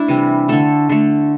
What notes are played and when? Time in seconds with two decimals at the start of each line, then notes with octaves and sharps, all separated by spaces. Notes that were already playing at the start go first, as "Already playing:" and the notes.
Already playing: A3 D4 E4
0.08 C3 E3 G3
0.48 D3 A3 A4
0.89 D3 A3